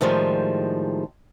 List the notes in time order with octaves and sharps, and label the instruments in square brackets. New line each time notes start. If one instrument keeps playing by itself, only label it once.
[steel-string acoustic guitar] A2 D#3 F3 G3 G#3